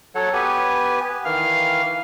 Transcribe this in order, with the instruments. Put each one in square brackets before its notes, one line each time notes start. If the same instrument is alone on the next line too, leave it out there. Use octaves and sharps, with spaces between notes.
[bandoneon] F#3 A4 C#5 F#5
B3 G4 B4 G#5
D#3 E3 F5 F6